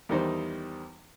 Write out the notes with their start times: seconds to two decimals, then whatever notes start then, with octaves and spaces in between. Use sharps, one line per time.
0.09 E2 D#3 G3 D#4 C5